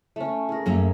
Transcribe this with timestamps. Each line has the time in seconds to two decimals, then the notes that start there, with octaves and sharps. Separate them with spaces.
0.16 A3 C#4
0.49 G#4 A#4
0.66 F#2 A3 A#3 C#4